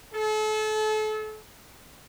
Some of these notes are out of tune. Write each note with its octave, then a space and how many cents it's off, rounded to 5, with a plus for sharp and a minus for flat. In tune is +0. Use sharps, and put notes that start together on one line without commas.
A4 -35